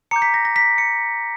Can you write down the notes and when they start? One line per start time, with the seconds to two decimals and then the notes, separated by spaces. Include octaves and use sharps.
0.11 A#5 D6 G6 C#7
0.22 B6
0.34 A#6
0.45 A#6
0.56 B6
0.78 C#7